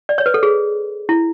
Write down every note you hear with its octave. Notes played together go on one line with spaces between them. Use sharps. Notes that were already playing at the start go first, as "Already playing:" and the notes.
D5
C#5
B4
A4
G#4
E4